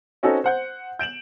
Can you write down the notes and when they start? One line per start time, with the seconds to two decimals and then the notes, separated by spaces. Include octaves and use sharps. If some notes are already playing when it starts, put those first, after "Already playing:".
0.23 C4 C#4 D#4 F#4 A4
0.44 C5 F#5 G6
0.99 G6 D7 E7 F#7